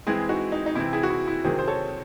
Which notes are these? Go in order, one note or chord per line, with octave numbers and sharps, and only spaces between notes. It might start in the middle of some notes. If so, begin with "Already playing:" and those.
E3 G#3 C4 E4 G#4
D#4 F#4
D#4
D#4
C3 E3 C4 E4
E4 G#4
F#4
E4
E4
C3 D#3 F#3 C4 G#4 C5
C5
A4 C#5